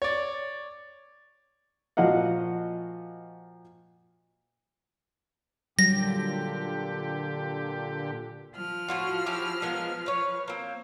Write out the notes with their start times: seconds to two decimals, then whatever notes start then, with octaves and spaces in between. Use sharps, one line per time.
0.02 C#5 D5
1.97 A#2 F3 F#4 D#5 F5 F#5
5.79 A#2 D3 F#3 G3 G4 A#6
8.53 F3 F6
8.88 A2 F4 F#4
9.26 C#4 E4 G4
9.62 G#3 A#3 B3
10.06 B4 C#5
10.48 A#3 C4